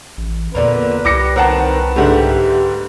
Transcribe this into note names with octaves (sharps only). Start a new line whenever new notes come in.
A1
E2 A#2 D3 A#4 B4
C2 G4 D6 A#6 C#7
D#3 C4 A#4 F#5 A5
G#2 D3 A3 G4 E5 F#5